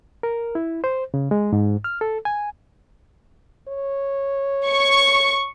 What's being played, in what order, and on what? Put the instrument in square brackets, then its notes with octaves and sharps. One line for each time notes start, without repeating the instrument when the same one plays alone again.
[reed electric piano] A#4
E4
C5
C#3
G#3
G#2
F6
A4
G#5
[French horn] C#5
[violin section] C#6